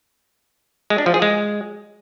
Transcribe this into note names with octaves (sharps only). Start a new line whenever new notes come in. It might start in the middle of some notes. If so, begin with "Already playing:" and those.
G#3
D4
F3
G#4
G#3